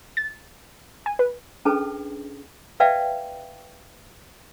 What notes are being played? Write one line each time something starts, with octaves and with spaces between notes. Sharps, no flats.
A6
G#5
B4
C#4 D4 G#4 A4 B4 A5
B4 D5 E5 F5 G5 A5